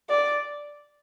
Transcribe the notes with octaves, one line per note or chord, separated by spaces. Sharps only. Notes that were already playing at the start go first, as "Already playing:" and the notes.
D5